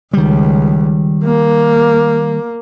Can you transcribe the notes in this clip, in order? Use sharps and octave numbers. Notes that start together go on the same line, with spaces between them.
C#2 D#3 G3
A#3